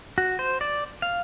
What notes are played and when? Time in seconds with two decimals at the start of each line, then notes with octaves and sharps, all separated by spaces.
0.18 F#4
0.39 C5
0.61 D5
1.02 F5